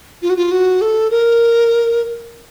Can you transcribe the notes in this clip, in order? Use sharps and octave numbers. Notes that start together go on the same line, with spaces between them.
F4
F#4
F4
F#4
A4
A#4